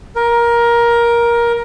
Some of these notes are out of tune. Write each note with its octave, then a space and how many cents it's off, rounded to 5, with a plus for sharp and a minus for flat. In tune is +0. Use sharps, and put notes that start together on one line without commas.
A#4 +15